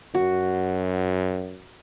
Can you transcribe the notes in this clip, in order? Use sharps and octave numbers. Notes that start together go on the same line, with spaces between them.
F#2 F#4